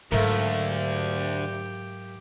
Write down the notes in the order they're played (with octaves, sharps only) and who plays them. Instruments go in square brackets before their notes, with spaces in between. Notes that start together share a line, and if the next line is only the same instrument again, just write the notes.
[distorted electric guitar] D2 [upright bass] G#2 F#3 [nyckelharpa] A3 [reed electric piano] A#4 E5 F5
[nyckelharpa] G4